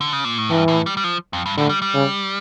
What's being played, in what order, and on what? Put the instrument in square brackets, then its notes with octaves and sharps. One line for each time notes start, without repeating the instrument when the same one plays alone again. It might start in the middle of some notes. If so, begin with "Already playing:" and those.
[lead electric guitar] D3
C#3
A#2
A2
[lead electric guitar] G2 [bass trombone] E3
[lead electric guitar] A2
G3
G3
F3
F2
G2
[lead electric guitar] A2 [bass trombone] D3
[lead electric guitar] G3
G3
[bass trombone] C#3